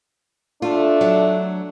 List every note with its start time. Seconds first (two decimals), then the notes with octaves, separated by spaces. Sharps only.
0.62 A3 D4 F4
1.01 F#3